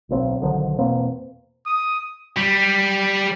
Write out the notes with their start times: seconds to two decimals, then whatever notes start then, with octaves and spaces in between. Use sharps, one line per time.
0.09 D1 B1 C4
0.40 B1 D3 D#3 F3
0.78 E2 B2 A#3 C4
1.66 D#6
2.37 G3